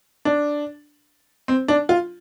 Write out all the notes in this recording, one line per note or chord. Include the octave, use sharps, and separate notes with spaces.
D4
C4
D4
F4